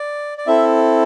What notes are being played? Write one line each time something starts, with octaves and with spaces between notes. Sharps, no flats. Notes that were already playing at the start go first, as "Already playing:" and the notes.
Already playing: D5
D5
C4 E4 A4 E5